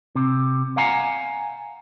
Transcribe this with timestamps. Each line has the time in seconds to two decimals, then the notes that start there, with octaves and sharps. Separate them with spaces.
0.15 C3
0.77 F5 F#5 G#5 A#5